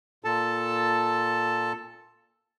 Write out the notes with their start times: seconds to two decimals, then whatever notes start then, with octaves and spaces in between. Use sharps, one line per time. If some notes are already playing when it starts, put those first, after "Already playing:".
0.24 A#2 A4 A5